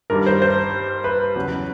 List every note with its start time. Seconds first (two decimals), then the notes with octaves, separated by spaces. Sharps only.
0.10 G2 D#3 G3 A#4
0.26 C5
0.42 C5
1.04 B4
1.36 E2 C#3 F#3